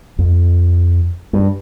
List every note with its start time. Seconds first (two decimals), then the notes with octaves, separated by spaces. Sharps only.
0.19 F2
1.33 G2